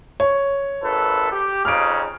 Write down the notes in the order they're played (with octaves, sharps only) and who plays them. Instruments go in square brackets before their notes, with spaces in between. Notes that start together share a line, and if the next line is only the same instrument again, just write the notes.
[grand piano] C#5
[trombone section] G#1 A4 B4
G4
[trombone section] F2 C#3 D#4 [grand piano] F6 D7